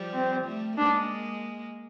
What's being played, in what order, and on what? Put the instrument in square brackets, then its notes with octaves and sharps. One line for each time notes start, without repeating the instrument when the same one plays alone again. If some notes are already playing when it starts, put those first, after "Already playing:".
Already playing: [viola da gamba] F3 G3
[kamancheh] C4
[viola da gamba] G3 A3
[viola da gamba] G#3 A#3 [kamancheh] D4